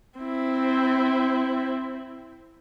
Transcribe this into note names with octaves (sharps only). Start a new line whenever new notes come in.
C4 E4